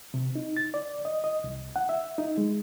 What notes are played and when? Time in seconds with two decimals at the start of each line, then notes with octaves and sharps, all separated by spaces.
0.14 C3
0.35 D#4
0.57 A6
0.74 D5
1.05 D#5
1.24 D#5
1.44 C2
1.76 F#5
1.89 E5
2.18 D#4
2.38 G#3